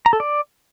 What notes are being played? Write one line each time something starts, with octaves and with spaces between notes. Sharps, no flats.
A#5
A4
D5